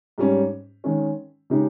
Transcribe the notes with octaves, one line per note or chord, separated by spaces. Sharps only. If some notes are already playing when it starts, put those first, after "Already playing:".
G#2 G3 C#4
D#3 G#3 C#4
C#3 G#3 D#4 G4